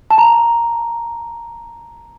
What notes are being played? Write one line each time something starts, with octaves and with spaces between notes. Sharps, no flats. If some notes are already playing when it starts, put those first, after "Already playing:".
A5
A#5